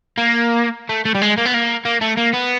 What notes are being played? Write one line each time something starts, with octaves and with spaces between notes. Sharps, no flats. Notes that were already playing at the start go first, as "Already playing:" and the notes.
A#3
A3
A3
G3
G#3
A#3
B3
A#3
A#3
A3
A#3
B3